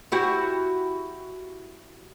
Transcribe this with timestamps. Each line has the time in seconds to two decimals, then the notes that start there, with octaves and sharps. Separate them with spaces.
0.12 E4 F#4 G4